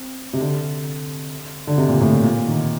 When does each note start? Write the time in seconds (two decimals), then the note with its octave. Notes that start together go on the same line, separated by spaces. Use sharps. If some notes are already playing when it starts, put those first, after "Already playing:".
Already playing: C4
0.33 C3
0.40 D3
1.67 D3
1.78 C3
1.89 A#2
2.00 A2
2.12 A#2
2.23 A#2
2.47 D#3